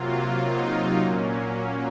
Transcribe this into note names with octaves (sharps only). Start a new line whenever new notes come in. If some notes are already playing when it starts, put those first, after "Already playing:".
Already playing: C3 F#3 A#3 F4
D#4
A#2 F#3 A#3 C#4